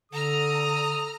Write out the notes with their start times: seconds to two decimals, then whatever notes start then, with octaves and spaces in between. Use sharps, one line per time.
0.12 D3 A4 A#5 D#6 F6